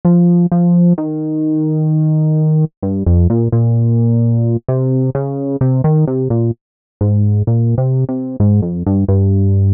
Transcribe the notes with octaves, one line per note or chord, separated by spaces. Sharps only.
F3
F3
D#3
G2
F2
A#2
A#2
C3
C#3
C3
D#3
C3
A#2
G#2
A#2
C3
C3
G#2
F2
G2
G2